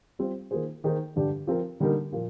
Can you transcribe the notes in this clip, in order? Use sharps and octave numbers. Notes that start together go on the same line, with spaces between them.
G3 C4 F4 C5
D#3 A#3 F4 G#4 C5
D#3 A#3 D#4 G#4 C5
G2 D3 G3 D4 G4
F3 C4 F4 A#4
D3 G3 A#3 D#4 A#4
A#2 F3 A#3